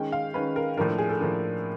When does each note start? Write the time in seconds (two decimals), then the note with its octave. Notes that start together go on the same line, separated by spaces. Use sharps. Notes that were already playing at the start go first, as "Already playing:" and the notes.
Already playing: D#3 G#3 C#4 G5
0.12 F5
0.34 D#3 G#3 C#4 B4
0.56 A#4
0.77 A2 F3 A#3 D4 A#4
0.88 A4
0.98 G#4
1.09 A4
1.20 A2 F3 A#3 D4